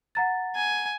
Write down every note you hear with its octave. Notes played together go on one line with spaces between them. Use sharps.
F#5 A#5 A6
G#5